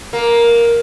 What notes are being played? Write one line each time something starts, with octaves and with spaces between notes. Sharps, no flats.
A#3